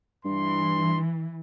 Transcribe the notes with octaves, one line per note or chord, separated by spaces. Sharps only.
G2 E3 C6